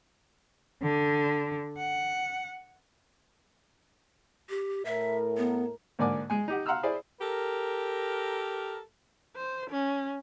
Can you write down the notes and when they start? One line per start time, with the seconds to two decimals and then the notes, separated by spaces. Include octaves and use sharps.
0.82 D3
1.78 F#5
4.50 G4
4.85 A2 A#4 E5
5.37 B3
5.99 G#2 D3 A#3 D5 G#5 D6
6.30 G#3 G#5
6.48 D#4 G4 F#5
6.66 F5 F#5 A#5 C6 E6 F6
6.83 E4 G#4 C5 D5 E5 G#5
7.20 G4 A4 A#4
9.36 C5
9.70 C#4